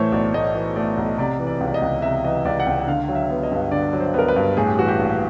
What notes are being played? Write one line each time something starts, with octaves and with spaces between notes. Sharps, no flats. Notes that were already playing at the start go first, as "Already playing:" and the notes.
Already playing: A2 E3 A3 C5 C#5
B1 D5
A2 D#5
E3
A3 D5
B1
C3 D5
E3
D5
C#2
D5
D#5
C#2
C3 E5
E3 D#5
C#2 D5
F#5
C#2 G5
F#5
D3 F5
F#3
E5
B3
D#5
G2
D3 D5
F#3
C5
B3 A#4
B4
G2
A2 G#4
G4
E3 F#4
G4
A#1